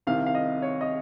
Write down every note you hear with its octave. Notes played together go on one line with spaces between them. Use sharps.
C2 C3 D#3 F5
F5
D#5
C#5
D#5